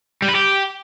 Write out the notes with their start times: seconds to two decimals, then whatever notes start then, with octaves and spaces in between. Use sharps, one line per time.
0.22 G3
0.29 B4
0.35 G4